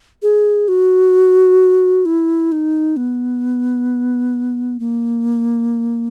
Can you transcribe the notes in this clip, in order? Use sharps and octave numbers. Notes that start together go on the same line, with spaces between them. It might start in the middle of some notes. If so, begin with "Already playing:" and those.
G#4
F#4
E4
D#4
B3
A#3